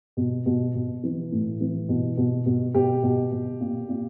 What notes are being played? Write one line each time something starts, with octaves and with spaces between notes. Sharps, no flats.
B2
B2
B2
E3
A2
E3
B2
B2
B2
B2 G4
B2
B2
A#2
A#2